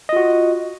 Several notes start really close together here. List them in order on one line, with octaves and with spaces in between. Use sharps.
D#5 F4 F#4